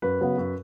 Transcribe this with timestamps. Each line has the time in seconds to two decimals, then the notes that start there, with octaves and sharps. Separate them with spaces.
0.02 F#2 B4
0.21 C#3 F#3 B3
0.38 F#2